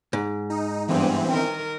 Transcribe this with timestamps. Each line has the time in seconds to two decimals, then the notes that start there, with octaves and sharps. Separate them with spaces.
0.13 G#2
0.50 D#4
0.88 G2 E3 B3 C4
1.32 D#3 A#4